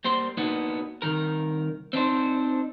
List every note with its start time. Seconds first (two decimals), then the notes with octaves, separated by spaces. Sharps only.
0.05 G3 A#3 C5 C6
0.37 A#3 B3 D4 D#4 F#4
1.02 C2 D#3 A#4
1.93 C4 D4 D#4 C5